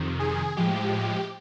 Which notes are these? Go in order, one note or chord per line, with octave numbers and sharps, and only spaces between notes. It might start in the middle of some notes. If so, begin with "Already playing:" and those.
Already playing: F2 C3 D#3
G#4
A2 F3 G#3 G4